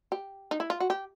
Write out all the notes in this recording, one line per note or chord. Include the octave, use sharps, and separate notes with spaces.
G4
D#4
E4
F4
F#4
G4